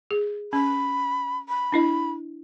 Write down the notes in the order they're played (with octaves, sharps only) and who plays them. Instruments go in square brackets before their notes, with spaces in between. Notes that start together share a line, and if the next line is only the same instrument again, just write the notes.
[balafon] G#4
[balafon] C#4 [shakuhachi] B5
[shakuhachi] B5
[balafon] D4 E4 D#5